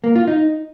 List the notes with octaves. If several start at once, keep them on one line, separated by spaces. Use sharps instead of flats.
A#3
F4
D#4